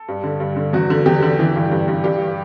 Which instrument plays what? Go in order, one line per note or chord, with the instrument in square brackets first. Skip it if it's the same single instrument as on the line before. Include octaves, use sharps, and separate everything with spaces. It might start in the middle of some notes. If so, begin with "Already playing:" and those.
Already playing: [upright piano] A4
G2
D3
G2
D3
E2 F#4
D3
E2 G4
D3
E3
G2
G2
G2
G2 G4